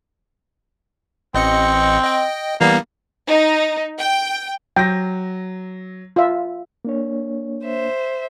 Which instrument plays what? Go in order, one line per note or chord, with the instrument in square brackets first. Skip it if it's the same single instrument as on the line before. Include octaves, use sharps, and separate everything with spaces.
[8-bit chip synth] A1 D#5 C#7 [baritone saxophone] C4
[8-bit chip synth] D#5 G5
[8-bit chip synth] E3 G3 B3 [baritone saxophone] A#3
[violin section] D#4
G5
[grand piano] F#3 A#6 [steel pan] G5
[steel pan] F4 E5
[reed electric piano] A#3 D4 C#5
[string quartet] C5 E5